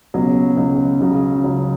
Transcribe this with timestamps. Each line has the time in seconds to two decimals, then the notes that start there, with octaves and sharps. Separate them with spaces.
0.14 C#2 B2 F#3
0.57 C#2 B2 F#3
1.00 C#2 C#3 F#3
1.44 C#2 C#3 F#3